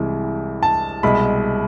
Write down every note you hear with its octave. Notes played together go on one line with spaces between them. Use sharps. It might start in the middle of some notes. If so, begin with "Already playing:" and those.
Already playing: C2 C3 E3 G#3
A5
C2 B2 G#3 B5